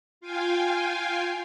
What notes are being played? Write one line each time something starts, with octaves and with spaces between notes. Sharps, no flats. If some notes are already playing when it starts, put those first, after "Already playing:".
F4 F5 G5 G#5